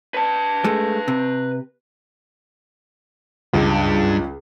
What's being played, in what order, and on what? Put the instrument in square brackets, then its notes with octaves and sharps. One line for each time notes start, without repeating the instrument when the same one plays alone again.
[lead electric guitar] B4 A5
[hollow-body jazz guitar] G#3 A3
C3
[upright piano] C#2 [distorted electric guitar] G2